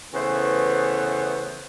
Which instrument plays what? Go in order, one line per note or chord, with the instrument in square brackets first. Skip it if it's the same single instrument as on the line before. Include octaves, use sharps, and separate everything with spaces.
[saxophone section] C#3 E3 A3 B3 C5